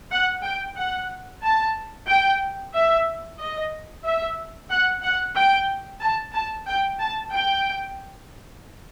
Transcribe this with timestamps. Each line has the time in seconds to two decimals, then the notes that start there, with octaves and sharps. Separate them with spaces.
0.11 F#5
0.44 G5
0.77 F#5
1.43 A5
2.08 G5
2.74 E5
3.39 D#5
4.05 E5
4.70 F#5
5.03 F#5
5.36 G5
6.02 A5
6.34 A5
6.67 G5
7.00 A5
7.32 G5